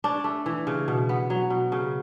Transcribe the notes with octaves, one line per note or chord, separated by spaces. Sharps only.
C#4 D4
A3
E3
C#3
B2
B3
F#3
B2
C#3